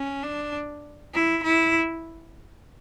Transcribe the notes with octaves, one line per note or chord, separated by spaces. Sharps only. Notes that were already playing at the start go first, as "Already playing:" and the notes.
Already playing: C#4
D4
E4
E4